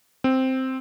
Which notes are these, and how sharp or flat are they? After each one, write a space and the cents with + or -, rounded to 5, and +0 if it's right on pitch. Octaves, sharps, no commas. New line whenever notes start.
C4 +0